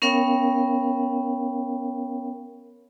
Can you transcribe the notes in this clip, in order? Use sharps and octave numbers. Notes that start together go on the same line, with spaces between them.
B3 C#4 A#4 C#5 F5 G5